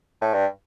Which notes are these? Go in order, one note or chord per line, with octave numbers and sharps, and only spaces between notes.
A2
G2